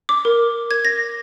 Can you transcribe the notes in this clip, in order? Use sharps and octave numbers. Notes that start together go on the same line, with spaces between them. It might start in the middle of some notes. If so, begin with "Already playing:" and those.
D6
A#4
G#6
A#6